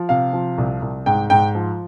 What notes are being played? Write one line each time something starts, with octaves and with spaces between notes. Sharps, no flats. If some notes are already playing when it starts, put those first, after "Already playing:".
Already playing: F3
C3 F5
F3
C2
C2
G#2 G5
G#2 G5
F3